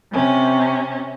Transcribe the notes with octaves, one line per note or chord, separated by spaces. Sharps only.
C3 C#4